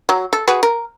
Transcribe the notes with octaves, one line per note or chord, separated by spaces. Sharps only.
F#3
A4
F#4 G#4 B4
A#4